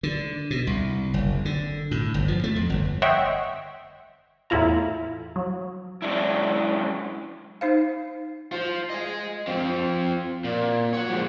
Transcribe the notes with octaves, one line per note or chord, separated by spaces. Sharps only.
D3
B2
C2
F#1
D3
A2
G1
F3
A3
F2
G1
C#5 D#5 E5 F#5 G5 C6
E2 A2 E4 F4 A#5
F#3
F#3 G#3 C#4 D4 E4
D#4 C5 F5
F4 C5
D#5 G#5
F3 C4
A#2
C#5 F#5
F3 G#3